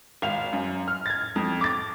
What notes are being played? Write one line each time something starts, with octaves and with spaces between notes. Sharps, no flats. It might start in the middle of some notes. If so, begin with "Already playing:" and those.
G#1 F5 F7
F#2
F6
G#6 A6
F2
D6 A6